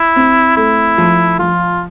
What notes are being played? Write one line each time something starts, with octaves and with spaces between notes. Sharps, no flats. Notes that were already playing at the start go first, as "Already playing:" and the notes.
Already playing: E4
C4
A3 E4
F3
F3 F4